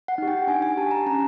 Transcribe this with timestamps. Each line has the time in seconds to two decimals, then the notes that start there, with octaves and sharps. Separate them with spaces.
0.08 F#5
0.18 D#4 G4
0.28 G5
0.47 D4 G#5
0.62 G#5
0.77 G4 A5
0.91 A#5
1.06 C#4 A#5